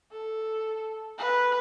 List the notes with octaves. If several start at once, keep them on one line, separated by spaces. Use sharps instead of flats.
A4
B4